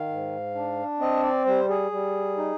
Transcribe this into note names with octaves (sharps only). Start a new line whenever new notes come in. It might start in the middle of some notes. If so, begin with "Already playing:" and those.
Already playing: D#3 F5
G#2
D4
C4 D#5
D5
G3 C5
G#4
G3
D#4